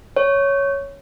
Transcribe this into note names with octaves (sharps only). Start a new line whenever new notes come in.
C#5